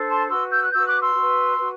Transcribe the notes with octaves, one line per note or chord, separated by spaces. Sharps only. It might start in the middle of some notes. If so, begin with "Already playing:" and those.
Already playing: D4 A4 C5
A5 C6
F#4 B4 C6 E6
E6 G6
F#6
F#4 B4 E6 G6
D6 F#6
C6 E6
F#4 B4
F#4 B4